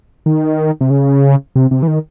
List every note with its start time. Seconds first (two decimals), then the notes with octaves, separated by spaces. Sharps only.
0.26 D#3
0.81 C3
0.90 C#3
1.55 C3
1.71 C3
1.83 E3
1.88 D#3